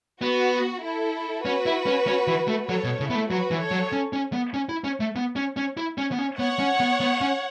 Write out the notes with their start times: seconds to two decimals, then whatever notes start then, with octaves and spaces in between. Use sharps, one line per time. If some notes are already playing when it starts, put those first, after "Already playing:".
0.22 B3 F#4
0.83 E4 A4
1.45 C#4 F#4 B4
1.66 E4
1.86 C#4
2.07 C#4
2.27 E3
2.48 A3
2.68 F#3 A4 C#5
2.84 B2
2.99 C#3 E4 A4
3.10 B3
3.15 A3
3.30 F#3 F#4 B4
3.51 E3
3.61 A4 C#5
3.71 F#3
3.92 C#4
4.13 C#4
4.33 B3
4.54 C#4
4.69 E4
4.84 C#4
5.00 A3
5.16 B3
5.36 C#4
5.57 C#4
5.77 E4
5.98 C#4
6.12 B3
6.19 C#4
6.38 B3 C#5 F#5
6.60 C#4
6.80 B3
7.01 B3
7.21 C#4